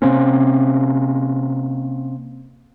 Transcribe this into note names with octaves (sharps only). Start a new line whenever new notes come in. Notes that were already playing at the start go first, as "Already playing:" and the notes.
C3 A#3 C4 C#4